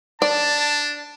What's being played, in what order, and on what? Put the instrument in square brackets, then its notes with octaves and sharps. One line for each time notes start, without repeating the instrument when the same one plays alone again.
[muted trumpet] D4 [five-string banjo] D5 [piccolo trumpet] A5